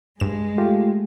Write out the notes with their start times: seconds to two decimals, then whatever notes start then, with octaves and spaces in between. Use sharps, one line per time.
0.20 G2 G#3 E7
0.58 A3 F4 G4